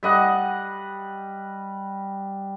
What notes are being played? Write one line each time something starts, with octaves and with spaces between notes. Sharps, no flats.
G3 D#5 F#5